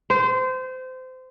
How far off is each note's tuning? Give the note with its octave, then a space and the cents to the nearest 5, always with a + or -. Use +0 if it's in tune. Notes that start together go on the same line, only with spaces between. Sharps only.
C5 -25